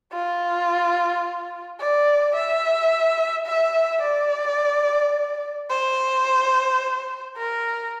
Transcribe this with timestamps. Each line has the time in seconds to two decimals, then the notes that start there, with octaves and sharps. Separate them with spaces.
0.13 F4
1.80 D5
2.35 E5
3.47 E5
4.02 D5
5.70 C5
7.37 A#4